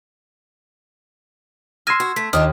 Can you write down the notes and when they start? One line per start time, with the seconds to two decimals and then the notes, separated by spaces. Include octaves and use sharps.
1.87 C6 E6 F6 G#6 A#6 D#7
2.00 F#4
2.16 A3 B6
2.33 D#2 D4 D#4 F4 D#6 F6